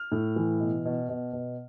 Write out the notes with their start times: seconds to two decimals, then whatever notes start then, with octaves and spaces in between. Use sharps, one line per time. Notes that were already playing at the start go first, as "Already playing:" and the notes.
Already playing: F6
0.12 A2
0.36 E3
0.60 B2
0.85 B2
1.09 B2
1.33 B2